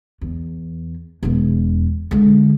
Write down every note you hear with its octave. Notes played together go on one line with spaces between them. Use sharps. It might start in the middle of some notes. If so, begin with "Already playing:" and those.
E2
E1 E2
D3 G#3